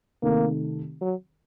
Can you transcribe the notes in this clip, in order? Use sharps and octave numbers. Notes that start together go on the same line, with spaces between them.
C3 D#3 A3 A#3 D#4
F#3